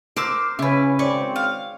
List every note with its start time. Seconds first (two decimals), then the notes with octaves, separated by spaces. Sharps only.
0.16 A#4 C5 D6 E6
0.59 C#3 C#4 E4 B4
0.99 G#1 C#3 C4 C#5 D5 C#6
1.36 F5